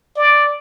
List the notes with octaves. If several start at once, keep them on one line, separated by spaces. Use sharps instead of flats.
D5